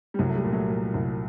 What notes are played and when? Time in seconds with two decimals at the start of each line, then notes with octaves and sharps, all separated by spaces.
0.14 G3
0.19 C2 F#3
0.29 A3
0.36 G3
0.44 A#2
0.53 F#3 A3
0.70 A#2
0.94 C2